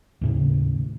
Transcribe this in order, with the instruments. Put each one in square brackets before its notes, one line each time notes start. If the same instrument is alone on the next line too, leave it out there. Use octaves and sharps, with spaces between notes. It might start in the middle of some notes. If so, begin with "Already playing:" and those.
[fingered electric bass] D#2 A2 C#3